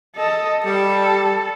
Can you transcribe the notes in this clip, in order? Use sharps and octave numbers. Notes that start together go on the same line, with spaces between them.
A4 D#5
G3 A4